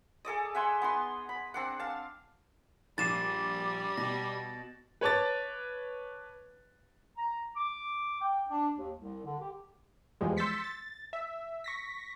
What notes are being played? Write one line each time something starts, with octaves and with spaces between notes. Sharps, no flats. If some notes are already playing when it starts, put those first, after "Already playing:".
G#4 A4 D5 D#5
E5 F#5 G#5 C6
B3 D#4 C6
B5
C4 D4 F#5
F5 A5
A#1 G3 D6 A6 C7 D#7 E7
B2 A#6
B4 C#5 A5 D6 A6
A#5
D6
G5
D4
D#2
C2
D3
G4
E2 F3 G3 G#3
C6 E6 G6 A6 B6 C#7
A6
E5
C#6 A#6 B6